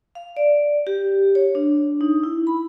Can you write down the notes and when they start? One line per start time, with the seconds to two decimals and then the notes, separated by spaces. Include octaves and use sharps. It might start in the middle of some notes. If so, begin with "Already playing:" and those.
0.15 F5
0.37 D5
0.87 G4
1.35 C#5
1.55 D4
2.01 D#4
2.23 E4
2.47 B5